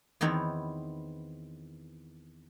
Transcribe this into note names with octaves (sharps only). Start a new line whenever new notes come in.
E2 D#3 B3 C4 C#5